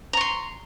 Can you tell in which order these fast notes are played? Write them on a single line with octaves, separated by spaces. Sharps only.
A#5 C#6 C6